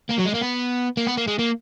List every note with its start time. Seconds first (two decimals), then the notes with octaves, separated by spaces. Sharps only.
0.09 A#3
0.18 F#3
0.26 G#3
0.34 A#3
0.41 B3
0.97 A#3
1.07 B3
1.17 A#3
1.28 G#3
1.39 A#3